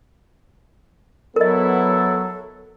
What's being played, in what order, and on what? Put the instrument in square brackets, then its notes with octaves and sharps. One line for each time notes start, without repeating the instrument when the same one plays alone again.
[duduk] F#3 [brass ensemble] B3 E4 [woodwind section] A4 [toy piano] A#4 D#5